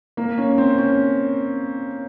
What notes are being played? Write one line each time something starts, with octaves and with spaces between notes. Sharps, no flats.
A#3
C#4
C4
C#4